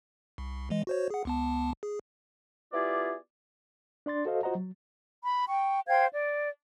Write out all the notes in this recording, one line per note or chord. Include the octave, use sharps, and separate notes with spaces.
C2
E3 G#3 D#5
F#4 C5 C#5
G#4 F#5
C#2 B3 A5
G#4
B3 E4 F4 G4 G#4 D5
D4 D5 C6 A6
F#4 A4 C5 D#5 F5
F4 F#4 C5 D#5 F#5 A#5
F#3
B5
G5 C#6
C5 F5 G5 G#6
D5